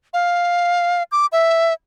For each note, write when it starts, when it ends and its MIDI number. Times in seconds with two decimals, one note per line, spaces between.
0.14 1.03 77
1.12 1.26 86
1.32 1.73 76